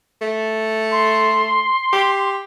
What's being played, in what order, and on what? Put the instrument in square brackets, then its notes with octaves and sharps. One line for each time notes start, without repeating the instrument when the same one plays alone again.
[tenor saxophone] A3
[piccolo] C6
[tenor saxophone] G4